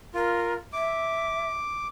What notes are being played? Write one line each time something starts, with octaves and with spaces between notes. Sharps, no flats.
F4 A#4
E5 D6